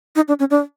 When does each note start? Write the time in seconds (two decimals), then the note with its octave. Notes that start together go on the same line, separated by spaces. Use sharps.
0.16 D#4
0.28 D4
0.39 C#4
0.51 D4